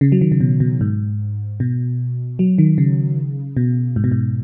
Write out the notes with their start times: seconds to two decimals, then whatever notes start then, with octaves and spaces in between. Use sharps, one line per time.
0.01 C#3
0.12 F#3
0.21 D#3
0.32 C#3
0.41 B2
0.60 B2
0.81 G#2
1.60 B2
2.39 F#3
2.58 D#3
2.78 C#3
3.57 B2
3.96 G#2
4.04 B2
4.12 G#2